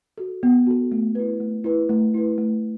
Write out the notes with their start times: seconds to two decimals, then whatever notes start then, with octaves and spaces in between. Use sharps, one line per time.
0.18 F#4 A4
0.43 B3
0.67 F#4 A4
0.92 A3
1.15 E4 B4
1.40 A3
1.64 E4 B4
1.89 A3
2.14 E4 B4
2.38 A3